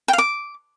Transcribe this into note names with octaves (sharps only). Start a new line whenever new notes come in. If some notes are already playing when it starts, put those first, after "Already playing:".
G5
F5
D6